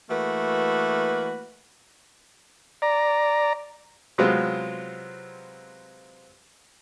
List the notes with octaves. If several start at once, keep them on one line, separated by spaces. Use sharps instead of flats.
E3 A3 A#3 F#4 B4
D5 A#5
C3 F#3 G#3 B3 C4 F4